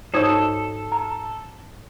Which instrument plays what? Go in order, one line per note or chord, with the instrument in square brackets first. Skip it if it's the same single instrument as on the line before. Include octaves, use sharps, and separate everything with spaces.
[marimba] G#2 D#6 G#6 [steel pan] D#4 C5 C#5 [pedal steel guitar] A4
[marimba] A#5